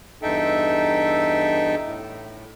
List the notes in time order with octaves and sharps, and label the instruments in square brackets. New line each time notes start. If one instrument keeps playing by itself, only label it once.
[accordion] E2 G2 D#4 A4 E5 G5
A2